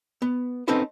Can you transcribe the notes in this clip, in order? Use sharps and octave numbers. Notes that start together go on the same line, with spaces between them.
B3
C4 C#4 D#4 A4 B4 C5